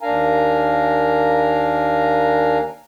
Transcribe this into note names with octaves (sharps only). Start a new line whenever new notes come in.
D#2 D4 A#4 F5 G#5 A#5